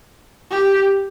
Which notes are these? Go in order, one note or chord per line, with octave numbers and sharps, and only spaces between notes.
G4